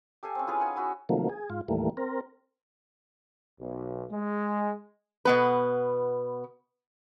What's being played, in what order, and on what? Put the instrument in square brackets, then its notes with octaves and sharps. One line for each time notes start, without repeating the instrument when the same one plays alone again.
[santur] G4 A4 F5 G#5
C4 C#4
E4 F4 G#4 B4
D#4 F#5 G#5
C#4 E4 F#4
[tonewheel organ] C3 D#3 F3 F#3 A3 A#3
G#4
G#2 F4
D#2 A2 E3 G3 A3 A#3
C4 A#4
[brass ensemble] B1
G#3
[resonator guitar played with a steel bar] B2 B3 B4